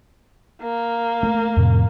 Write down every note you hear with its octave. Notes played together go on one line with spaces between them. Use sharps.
A#3
A3
F2 A2 C3